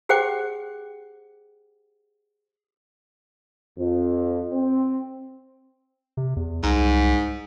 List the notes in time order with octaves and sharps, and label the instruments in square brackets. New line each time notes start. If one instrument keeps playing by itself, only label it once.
[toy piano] G4 G#4 C5 F#5 G5 D6
[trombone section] F2
C4
[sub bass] C3
E2
[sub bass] C2 [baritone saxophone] G#2